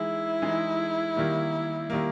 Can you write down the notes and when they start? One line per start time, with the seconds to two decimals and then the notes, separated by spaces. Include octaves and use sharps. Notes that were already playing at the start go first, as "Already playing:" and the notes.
Already playing: E3 G#3 D#4 E4 G#4
0.42 E3 G#3 D#4 G#4
1.16 D#3 G3 A#3
1.90 D#3 G3 A#3